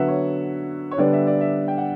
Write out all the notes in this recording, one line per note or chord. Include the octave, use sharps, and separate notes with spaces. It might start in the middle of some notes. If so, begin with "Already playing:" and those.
Already playing: D3 F#3 B3 E5 F#5
C#5
C#5
D3 G3 B3 D4 D5
E5
D5
E5
G5
F#5